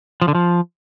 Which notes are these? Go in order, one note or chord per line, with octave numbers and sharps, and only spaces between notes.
F3
D3
F3